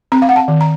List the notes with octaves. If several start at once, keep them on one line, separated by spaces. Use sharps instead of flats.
C4 A#5
F5
F#5
A5
D#3
A#5